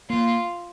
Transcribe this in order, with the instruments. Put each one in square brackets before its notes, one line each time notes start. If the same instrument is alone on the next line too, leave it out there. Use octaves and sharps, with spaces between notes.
[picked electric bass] A#3 [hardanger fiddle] F4